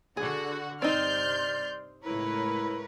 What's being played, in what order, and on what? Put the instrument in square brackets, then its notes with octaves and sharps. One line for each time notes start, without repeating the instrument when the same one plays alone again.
[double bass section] D3 [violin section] F#4 F#5 [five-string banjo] G#4
[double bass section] G2 C3 [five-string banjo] C4 D#4 [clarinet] D5 [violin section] C6 F6 G6
[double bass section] C#2 A2 [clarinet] E4 [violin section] A#4 B4 C#5